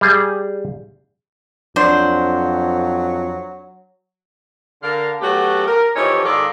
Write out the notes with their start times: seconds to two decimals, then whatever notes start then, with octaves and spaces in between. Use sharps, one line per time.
0.01 G3 G#4
1.76 F2 F#3 D4 C5
4.83 D3 A#4 F5
5.21 F#3 A3 B3 F#4 G4
5.66 A#4
5.96 E3 F3 D#4 G4 A4 C#5
6.24 G#2 D#3 A4 D5 F5